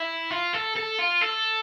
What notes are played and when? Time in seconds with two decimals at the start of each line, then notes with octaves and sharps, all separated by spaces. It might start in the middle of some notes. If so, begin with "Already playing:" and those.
Already playing: E4
0.30 F4
0.53 A4
0.76 A4
0.98 F4
1.21 A4